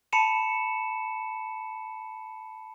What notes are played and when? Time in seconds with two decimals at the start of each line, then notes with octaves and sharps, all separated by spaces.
0.13 A5 B5 C#7 E7